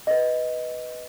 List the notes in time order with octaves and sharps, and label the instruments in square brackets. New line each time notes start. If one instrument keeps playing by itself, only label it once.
[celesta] B4 D#5